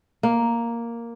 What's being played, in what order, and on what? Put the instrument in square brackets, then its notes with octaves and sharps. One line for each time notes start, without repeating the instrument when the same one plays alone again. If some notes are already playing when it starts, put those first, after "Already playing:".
[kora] A#3